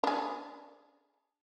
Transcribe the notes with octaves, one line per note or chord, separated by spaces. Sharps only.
D4 G#4